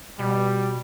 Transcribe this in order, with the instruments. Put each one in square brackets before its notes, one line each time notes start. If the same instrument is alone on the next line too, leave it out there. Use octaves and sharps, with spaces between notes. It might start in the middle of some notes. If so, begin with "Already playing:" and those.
[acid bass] B2 [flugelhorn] G3